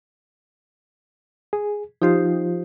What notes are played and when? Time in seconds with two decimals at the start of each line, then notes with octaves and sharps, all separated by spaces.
1.53 G#4
2.02 F3 D#4 F4 G4 C5